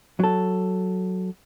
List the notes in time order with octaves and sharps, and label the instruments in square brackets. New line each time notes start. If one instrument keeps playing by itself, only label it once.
[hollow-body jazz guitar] F#3 A4